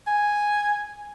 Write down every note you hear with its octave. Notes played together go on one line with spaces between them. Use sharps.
G#5